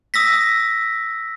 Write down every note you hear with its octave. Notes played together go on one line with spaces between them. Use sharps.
D#6 E6 A#6 B6